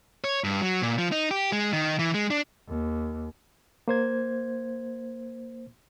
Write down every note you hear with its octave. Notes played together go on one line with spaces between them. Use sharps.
C#5
G2
F#3
A#2
F3
D#4
G4
G#3
D#3
E3
G#3
D4
D#2
A#3 C5 G#6